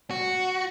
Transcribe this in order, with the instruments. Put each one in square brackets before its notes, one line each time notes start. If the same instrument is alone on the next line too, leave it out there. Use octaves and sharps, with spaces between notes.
[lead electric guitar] F#4